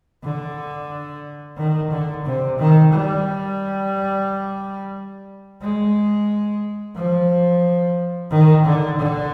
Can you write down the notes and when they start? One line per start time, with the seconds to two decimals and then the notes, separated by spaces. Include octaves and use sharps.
0.23 D3
1.57 D#3
1.90 D3
2.25 C3
2.58 D#3
2.93 G3
5.62 G#3
6.96 F3
8.31 D#3
8.65 D3
8.99 D3